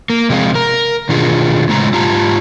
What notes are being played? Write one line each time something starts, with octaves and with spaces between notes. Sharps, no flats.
A#3
C3 F3 G#3 F4
A#4
B2 D#3 D4 F4 G#4
A2 C#3 G#3 F4 A#5
G#2 F4 G4 A5 A#5